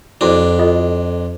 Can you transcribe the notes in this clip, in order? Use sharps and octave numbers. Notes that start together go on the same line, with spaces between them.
F2 D4 E4 F#4
F4 A4 D#5